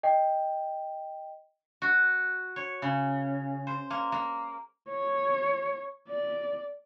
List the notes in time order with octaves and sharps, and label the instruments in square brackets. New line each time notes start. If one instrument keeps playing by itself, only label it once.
[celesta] D#5 G5
[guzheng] F#4
C#5
C#3
C5
A#3
A#3
[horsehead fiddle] C#5
D5